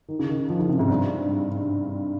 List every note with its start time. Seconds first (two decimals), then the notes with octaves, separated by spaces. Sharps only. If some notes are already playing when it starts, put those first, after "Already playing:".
0.09 D#3
0.19 C#3
0.29 D#3
0.50 F3
0.59 C#3
0.69 C3
0.79 G#2
0.89 G2